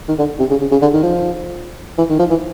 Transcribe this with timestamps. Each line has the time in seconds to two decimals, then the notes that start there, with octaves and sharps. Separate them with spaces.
0.08 D#3
0.18 D3
0.39 C3
0.50 C#3
0.61 C#3
0.71 C#3
0.82 D3
0.93 D#3
1.03 F3
1.98 E3
2.09 D#3
2.19 F3
2.30 E3